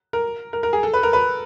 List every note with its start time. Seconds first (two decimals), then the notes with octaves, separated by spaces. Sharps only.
0.13 A#4
0.53 A#4
0.63 A#4
0.73 G#4
0.83 A4
0.94 B4
1.03 A#4
1.13 B4